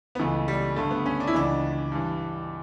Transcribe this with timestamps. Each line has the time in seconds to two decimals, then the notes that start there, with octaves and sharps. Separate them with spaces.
0.15 B3
0.19 C#2 C#3 E3 A3
0.48 G3
0.76 G2 D3 A3
0.91 B3
1.06 C#4
1.20 D4
1.27 E4
1.34 C#2 C#3 E3 D4
1.92 G2 E3